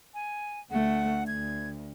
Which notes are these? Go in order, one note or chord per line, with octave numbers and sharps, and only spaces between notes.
G#5
D2 A3 F#5
D2 G#6